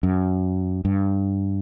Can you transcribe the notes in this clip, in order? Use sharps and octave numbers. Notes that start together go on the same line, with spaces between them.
F#2
G2